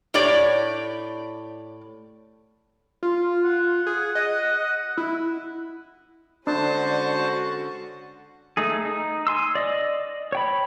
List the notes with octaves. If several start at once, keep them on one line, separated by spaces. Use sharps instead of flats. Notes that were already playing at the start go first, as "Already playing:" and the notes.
A2 G4 C#5 D5
F4
F#5
G#4
D#5
E4
D3 G#3 C#4 D4 F#4 C5 A5
A3 D#4 G#4
D#4
G#5 C6 E6
D5 D#5
C#5 G5 B5